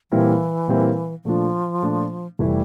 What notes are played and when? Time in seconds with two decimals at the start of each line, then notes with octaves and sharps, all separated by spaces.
0.11 A#2 E3 G3 C4 E4 A#4
0.68 A#2 G3 C4 E4 A#4
1.25 A#2 F3 A3 D4 F4
1.83 A#2 A3 D4 F4
2.39 F1 E3 G3 A3 E4